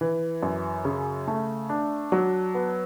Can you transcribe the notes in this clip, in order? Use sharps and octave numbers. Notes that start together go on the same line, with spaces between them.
E3
F#2
C#3
A3
D4
F#3
B3